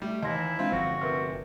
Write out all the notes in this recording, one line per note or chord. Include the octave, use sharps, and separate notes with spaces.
G3 A3
D#2 E3 E4 D#5 C6 A#6
G#3 C4 D4 F4
G1 F3 F#4 C5 A#6
C3 A#4 B4 F6